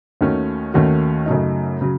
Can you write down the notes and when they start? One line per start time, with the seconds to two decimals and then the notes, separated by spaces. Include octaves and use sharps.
0.21 D#2 D#3 A3 C#4 F#4
0.74 D#2 D#3 A3 C#4 F#4
1.26 F#2 C#3 F#3 A3 D#4
1.81 C#3 F#3